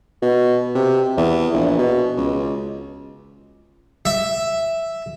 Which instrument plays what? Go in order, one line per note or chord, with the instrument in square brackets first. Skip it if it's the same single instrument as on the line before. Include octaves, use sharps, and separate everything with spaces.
[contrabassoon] B2
C3
E2
A#1
B2
C#2
[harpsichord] E5